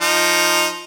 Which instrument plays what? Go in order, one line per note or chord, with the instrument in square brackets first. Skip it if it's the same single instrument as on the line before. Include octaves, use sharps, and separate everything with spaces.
[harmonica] F3 D#4